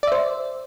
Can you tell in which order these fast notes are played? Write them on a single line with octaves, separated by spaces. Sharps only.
D5 E5 C5